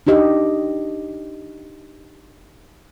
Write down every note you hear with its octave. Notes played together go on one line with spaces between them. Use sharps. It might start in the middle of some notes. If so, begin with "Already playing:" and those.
D4 D#4 G4 D#5